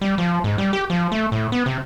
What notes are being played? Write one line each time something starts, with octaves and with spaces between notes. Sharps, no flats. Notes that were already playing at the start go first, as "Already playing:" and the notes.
G3
F3
G#2
G3
G4
F3
A3
A2
B3
C3